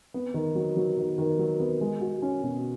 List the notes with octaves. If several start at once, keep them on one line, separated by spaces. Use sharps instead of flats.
B3
D#3
F#3
F#3
D#3
D#3
F#3
B3
G#3
F#4
C#4
B2